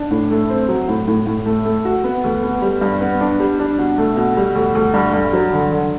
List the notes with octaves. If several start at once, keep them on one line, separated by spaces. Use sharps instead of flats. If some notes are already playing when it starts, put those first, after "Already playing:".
Already playing: D4
A2
A3
C4
F#3
A2
A2
A2
A3
A3
F#4
B3
D2
B3
G3
G2
B3
D4
G3
D4
B2
A3
B2
G3
D2
D2
G2
G2
F#3
D3
D3